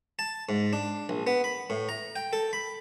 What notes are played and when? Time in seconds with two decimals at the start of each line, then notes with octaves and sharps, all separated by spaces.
0.19 A5
0.49 G#2
0.73 D4
1.09 A#1
1.27 B3
1.44 B5
1.70 A2
1.89 A#5
2.16 G5
2.33 A4
2.53 B5